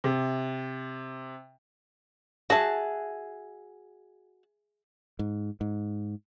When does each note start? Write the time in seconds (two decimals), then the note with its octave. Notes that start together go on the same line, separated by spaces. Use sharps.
0.04 C3
2.50 F#4 G#4 E5 A5
5.19 G#2
5.61 G#2